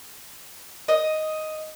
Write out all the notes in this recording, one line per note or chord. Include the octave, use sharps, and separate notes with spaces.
D#5